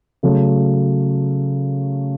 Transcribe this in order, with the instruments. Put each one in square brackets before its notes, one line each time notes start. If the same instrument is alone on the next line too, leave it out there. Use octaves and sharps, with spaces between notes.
[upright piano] C#3 F#3 A3